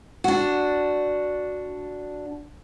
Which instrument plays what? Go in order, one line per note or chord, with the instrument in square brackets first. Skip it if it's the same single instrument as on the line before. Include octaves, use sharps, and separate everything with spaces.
[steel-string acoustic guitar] D4 F#4